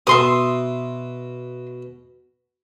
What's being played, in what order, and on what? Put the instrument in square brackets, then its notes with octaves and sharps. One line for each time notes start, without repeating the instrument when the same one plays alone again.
[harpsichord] B2 [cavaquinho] E5 C6 D#6